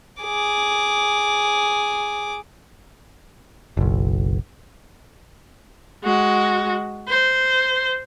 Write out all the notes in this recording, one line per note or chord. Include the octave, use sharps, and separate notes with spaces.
G#4 D6
F#1 B1
G#3 F#4
C5